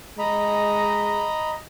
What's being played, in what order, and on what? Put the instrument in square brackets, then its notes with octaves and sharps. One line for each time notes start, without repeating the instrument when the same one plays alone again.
[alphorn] G#3 [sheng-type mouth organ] D#5 A#5 B5